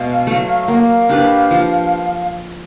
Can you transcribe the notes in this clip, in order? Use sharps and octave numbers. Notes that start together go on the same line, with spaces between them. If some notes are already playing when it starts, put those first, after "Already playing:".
Already playing: B2 G#3 F5
F#3 A3
A#3 F5 F#5
D4 G4 B4
F3